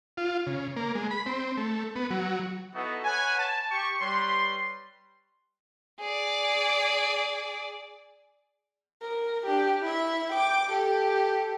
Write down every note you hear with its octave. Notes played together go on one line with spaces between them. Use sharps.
F4
C#3
A#3
G#3
B5
C4
A3
B3
F#3
B3 D#4 E4 F#4 A4 B4
B4 C#5 F#5 G#5
A5
G4 C#6
G3 B4 C#5 C6
G#4 D5
A#4
D4 G4
E4 E5
G5 D6
G4 A4